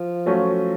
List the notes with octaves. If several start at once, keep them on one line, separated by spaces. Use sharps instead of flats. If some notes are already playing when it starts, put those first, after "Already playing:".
Already playing: F3
F#3 A3 C#4 F4